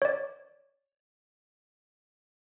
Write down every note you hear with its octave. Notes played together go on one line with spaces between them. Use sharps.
C#5 D5